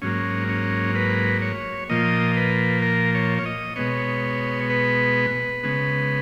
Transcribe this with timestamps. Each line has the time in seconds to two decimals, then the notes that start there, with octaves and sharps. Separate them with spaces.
0.02 G#2 F#3 A#3 C#4
0.49 C#4
0.96 B4
1.42 C#5
1.89 A#2 F3 A#3 D#5
2.37 B4
2.83 A#4
3.15 C#5
3.39 C#5
3.45 D#5
3.76 B2 G#3 B3 C#5
4.70 B4
5.63 C#3 G#3 B3